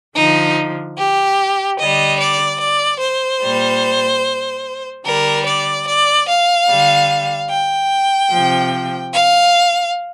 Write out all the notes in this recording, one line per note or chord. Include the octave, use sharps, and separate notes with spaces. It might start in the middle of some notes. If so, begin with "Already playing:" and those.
D3 F3 D#4
G4
D3 G3 D#5
D5
D5
C5
A#2 G3
D3 G3 A#4
D5
D5
F5
D3 G3
G5
C3 F3
F5